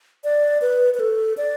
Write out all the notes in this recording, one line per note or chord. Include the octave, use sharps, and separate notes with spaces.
D5
B4
B4
A4
D5